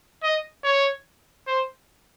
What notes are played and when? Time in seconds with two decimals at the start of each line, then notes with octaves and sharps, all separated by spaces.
0.23 D#5
0.64 C#5
1.47 C5